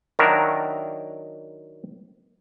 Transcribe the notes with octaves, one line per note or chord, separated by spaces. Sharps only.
D#3 F#3 D4 E4 F#4 A#4